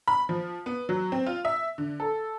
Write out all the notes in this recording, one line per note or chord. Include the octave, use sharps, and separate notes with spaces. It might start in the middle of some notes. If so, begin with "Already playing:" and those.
B5
F3
B3
F#3
C4
F4
E5
D3
A4